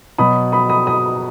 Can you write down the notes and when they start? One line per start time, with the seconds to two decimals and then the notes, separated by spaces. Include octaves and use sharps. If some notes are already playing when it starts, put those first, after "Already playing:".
0.18 B2 F#3 B5 D#6
0.52 B5 D#6
0.69 B5 D#6
0.87 B5 D#6